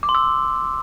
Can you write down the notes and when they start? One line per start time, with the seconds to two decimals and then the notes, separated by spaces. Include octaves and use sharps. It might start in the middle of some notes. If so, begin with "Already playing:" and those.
0.03 D6
0.09 C6
0.15 E6